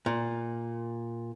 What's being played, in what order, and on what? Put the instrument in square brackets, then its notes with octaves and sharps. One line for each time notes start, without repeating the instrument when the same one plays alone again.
[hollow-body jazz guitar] A#2